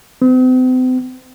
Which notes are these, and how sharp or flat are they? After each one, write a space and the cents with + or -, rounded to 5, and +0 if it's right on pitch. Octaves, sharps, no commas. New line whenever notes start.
C4 -40